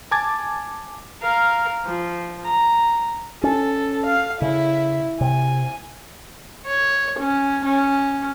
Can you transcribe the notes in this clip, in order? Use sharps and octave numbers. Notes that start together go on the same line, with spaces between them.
G#5 A5 D6 G#6 A6
A#4 F5
F3
A#5
C#4 A4
F5
C#3 E4
C3 G#5
C#5
C#4
C#4